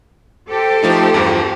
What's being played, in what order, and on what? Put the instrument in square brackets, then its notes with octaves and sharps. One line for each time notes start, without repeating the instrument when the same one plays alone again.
[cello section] G4 A4 C5
[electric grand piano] F3 A3 D#4
E2 G2 F3